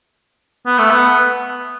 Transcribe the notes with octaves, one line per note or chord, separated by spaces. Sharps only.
B3
A3
B3